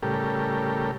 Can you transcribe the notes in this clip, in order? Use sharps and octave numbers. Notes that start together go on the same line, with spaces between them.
A2 C#3 G3 G4 A4 A#4